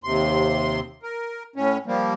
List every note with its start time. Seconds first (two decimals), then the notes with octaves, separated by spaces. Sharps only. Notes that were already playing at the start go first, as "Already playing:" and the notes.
0.04 D#2 C3 C6
1.03 A#4
1.56 A2 C#4
1.86 F3 G3 A#3